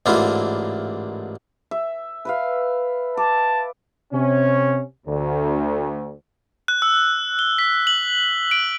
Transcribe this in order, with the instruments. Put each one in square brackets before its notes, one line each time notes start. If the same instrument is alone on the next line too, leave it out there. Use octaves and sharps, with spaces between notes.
[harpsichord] A1 G#2 D3 A#3 E4 F4
[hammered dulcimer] E5
B4 E5 F5
[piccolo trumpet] A5 [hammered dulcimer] D6
[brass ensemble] C3 C#4
D2
[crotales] F#6
E6
G7
B6
F#7
D7